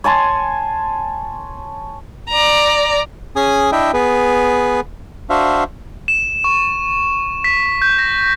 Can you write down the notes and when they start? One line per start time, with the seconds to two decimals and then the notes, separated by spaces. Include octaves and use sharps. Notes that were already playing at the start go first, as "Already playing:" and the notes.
0.04 C#5 G#5 A5 C6
2.29 D5 A#5
3.36 C#4 G#4 G#5 D#6
3.72 D4 E4 D#5 E5 G5
3.94 B3 G#4 B4
5.30 D4 F#4 C5 E5 F5
6.08 E7
6.44 C#6
7.44 B6
7.82 G6
7.98 A#6